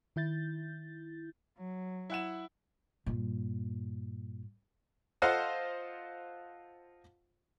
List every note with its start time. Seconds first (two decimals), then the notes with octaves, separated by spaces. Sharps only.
0.16 D#3 E4 G6 A6
1.58 F#3
2.10 E4 F#5 E7
3.06 G2 A#2
5.22 F4 A4 C5 D#5 F5 F#5